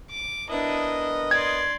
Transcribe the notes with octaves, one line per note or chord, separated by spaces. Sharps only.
D6
B3 D4 E4 A#4 D#5
D5 C6 G#6